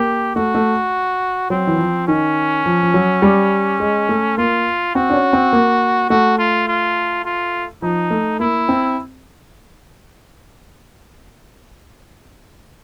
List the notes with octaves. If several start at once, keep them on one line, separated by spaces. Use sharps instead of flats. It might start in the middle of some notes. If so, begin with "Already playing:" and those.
Already playing: A#3 G4
A3 F#4
A3
F#3 C4
E3
F3
D#3 C#4
F3
F3
F#3
G3
G#3
A3
A#3 F4
C4 F#4
D4
C#4
C4
A#3
A3 F#4
F4
F4
F4
F3 D#4
A3
A#3 E4
C4